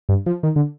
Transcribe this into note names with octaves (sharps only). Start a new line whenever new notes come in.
G2
F3
D#3
D3